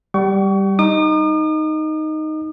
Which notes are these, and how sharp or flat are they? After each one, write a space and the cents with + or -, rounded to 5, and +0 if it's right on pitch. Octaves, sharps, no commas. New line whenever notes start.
G3 +0 G5 -45 C#6 +30
D#4 +0 D#6 -45